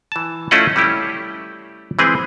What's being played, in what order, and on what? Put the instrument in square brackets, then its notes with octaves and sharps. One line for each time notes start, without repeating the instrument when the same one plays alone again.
[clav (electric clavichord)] E3 A5
A3 C#4 E4 F4 D#5 F#5
G3 A3 C#4 E4 G4
E3 G#3 C4 G#4 B4